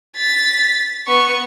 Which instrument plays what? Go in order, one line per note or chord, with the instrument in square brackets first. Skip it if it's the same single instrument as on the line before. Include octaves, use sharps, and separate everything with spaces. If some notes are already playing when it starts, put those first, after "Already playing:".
[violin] A6 B6
B3 C#6